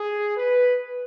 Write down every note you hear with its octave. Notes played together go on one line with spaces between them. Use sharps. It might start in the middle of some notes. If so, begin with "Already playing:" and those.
Already playing: G#4
B4